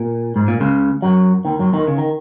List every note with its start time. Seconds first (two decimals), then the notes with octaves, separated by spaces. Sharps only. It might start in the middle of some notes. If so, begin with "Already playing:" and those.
Already playing: A#2
0.36 G#2
0.48 A#2
0.60 C#2 C#3
1.02 F#2 F#3
1.45 D#2 D#3
1.59 F#2 F#3
1.73 D#2 D#3
1.87 C#3
1.98 D#3